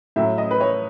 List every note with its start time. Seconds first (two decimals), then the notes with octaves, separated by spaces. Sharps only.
0.16 A2 F#3 E5
0.38 D#5
0.51 B4
0.61 C#5